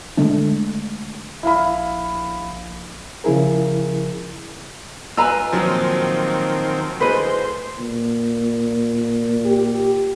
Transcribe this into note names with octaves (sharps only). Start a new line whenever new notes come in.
D3 G#3 A3 D4
A#1 E4 F5 B5
C#3 F3 E4 G#4 A#4
F4 B4 D#5 G#5 A#5 E6
A#2 D#3 F3 F#3 C4 D#4
D2 E4 G#4 B4 C5 D#5
A#2
G4